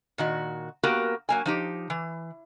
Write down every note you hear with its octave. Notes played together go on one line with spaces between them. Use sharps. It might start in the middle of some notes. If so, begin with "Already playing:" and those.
A#2 D#3 F#4
A#3 B3 F#4 G4 A#4
F#3 A#3 G#5
F3 D#4 G4
E3